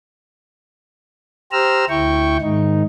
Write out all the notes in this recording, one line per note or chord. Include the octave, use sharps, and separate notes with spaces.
G4 C5 A#5 E6 F6
D2 E4 G5 C#6
G#2 D#3 D#4